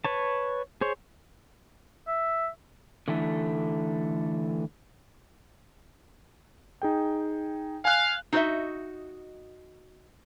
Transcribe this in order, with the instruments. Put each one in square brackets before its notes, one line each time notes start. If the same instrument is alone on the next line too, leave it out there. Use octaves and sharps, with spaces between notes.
[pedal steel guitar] B4 C#5 A5
G#4 C5 C#5
[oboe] E5
[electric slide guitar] D3 E3 A3
[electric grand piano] D#4 G#4 G5
[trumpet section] F5 [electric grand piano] G#5 F#6
[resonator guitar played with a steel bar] D#4 F#4 A4 C5 D#5 E5